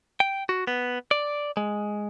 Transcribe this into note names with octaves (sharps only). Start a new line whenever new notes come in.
G5
F#4
B3
D5
G#3